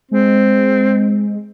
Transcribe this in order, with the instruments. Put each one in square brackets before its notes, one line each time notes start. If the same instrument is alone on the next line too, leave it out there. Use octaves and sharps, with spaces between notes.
[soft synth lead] G#3 [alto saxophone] C4